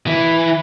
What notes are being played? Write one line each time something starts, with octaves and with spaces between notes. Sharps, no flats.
E3